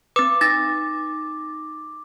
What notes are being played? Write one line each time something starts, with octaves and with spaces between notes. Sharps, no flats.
C4 B4 D6
D#4 A6 A#6